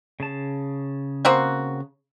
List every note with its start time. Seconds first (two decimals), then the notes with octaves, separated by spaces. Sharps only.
0.20 C#3 A5
1.25 A#3 C4 F#4